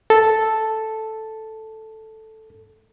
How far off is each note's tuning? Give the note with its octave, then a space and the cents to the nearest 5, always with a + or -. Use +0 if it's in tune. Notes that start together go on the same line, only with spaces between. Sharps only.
A4 +0